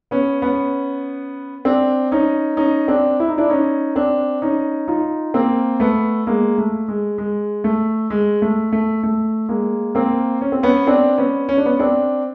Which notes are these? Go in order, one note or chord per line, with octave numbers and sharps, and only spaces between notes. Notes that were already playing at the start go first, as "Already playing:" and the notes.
B3 C#4
B3 C#4
C4 D4
C#4 D#4
C#4 D#4
C4 D4
E4
D#4
D4 E4
C#4 D#4
C4 D4
C#4 D#4
D#4 F4
A#3 C4
A3 B3
G#3 A#3
A3
G#3
G#3
A3
G#3
A3
A3
A3
G#3 A#3
A#3 C4
C#4
C4
B3 C#4
C4 D4
B3 C#4
C#4
D4
B3 C#4
C4 D4